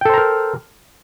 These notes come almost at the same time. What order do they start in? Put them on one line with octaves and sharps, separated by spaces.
G5 A4 C5 A#5 A#4